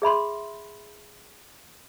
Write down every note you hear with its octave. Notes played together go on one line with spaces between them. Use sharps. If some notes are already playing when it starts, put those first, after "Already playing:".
G#4 E5 B5 C6